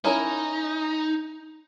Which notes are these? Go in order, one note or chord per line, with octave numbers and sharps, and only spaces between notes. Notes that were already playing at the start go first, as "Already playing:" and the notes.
C#4 D#4 E4 A#4